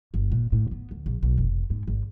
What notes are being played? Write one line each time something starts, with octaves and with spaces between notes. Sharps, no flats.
G1
A#2
A2
B3
D2
A#1
B1
F1
G#2
G#1